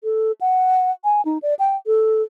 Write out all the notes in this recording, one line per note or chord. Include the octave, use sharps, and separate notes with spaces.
A4
F#5
G#5
D#4
D5
G5
A4